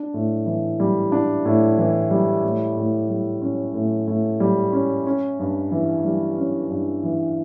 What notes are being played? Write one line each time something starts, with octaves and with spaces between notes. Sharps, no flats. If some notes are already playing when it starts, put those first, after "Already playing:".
Already playing: D4
A2
E3
G3
D4
A2
E3
G3
A2
A2
G3
C#4
A2
A2
G3
C#4
C#4
G2
E3
G3
C#4
G2
E3